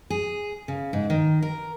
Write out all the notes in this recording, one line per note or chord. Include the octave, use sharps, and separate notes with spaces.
G#4
C#3
G#2
D#3
A#4